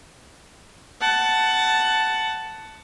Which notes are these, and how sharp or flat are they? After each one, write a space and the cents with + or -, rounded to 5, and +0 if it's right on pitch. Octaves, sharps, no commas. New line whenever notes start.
F#5 +15 A5 +0